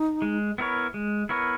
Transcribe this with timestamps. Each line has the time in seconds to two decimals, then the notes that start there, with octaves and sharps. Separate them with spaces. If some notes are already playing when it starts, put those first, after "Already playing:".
Already playing: D#4
0.22 G#3
0.58 B3 E4 A#4 C#5
0.94 G#3
1.29 B3 E4 A#4 C#5